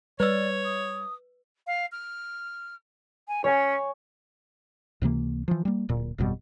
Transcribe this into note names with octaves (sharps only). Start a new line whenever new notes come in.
G3 B4 C#5 D5 E6
D#6
F5
F6
G#5
C#4 C#5 G#5
C#2 C3 E3 A#3
E3 F3
G3 A#3
D1 A#2
G1 F2 B2 G3